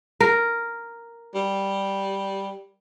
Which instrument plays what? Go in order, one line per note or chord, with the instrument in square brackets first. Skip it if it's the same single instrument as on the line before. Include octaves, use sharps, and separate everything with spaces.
[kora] A#4
[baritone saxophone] G3